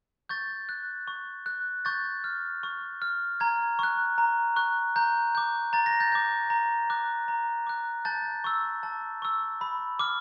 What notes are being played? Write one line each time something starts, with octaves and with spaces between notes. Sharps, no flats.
C#6 G6 A6
F#6
C#6
F#6
C#6 G6 A6
F6
C#6
F6
A#5 G#6
C#6 F#6
A#5
C#6 F#6
A#5 G6
D6 G6
A#5 A6
A#6
G6 A6
D6 G6
A#5
D6 F#6
A#5
D6 F#6
A5 G6 A6
C#6 E6
A5
C#6 E6
B5
D6 F6